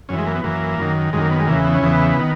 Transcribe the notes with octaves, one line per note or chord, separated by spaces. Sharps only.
F#2 E3 C#4
G#3
A#3
B3
F#2 E3 A#3
F#2 D#3
F#2 D#3 G#3
A#3
B3
G#3
E2 C#3 E3 A#3
B3
C#4
E2 C#3 E3 B3
D#3